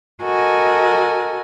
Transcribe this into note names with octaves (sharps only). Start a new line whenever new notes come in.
F#4 A4 A#4 D#5 G#5